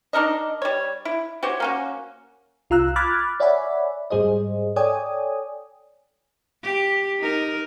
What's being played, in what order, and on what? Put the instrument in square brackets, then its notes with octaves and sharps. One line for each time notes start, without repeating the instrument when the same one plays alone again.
[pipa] D4 D#4 A#4 D#5
G3 C#5
E4
F#4 G4 C5 C#5
A#3 C#4 F#4
[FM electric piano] C2 F4 F5 A#5 E6 F#6
B5 D6 F6 F#6 G#6 A6
C#5 D5 E5 F#5 G#5 B5
G#2 G3 G#4 C5 D#5
A4 C#5 D5 G5 G#5 D#6
[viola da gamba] G4
D#4 A#4